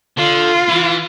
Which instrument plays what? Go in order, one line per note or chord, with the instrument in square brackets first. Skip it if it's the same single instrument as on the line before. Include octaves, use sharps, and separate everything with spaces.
[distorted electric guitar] D3 [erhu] F4
[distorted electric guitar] E3